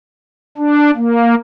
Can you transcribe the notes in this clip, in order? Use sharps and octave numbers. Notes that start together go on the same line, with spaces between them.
D4
A#3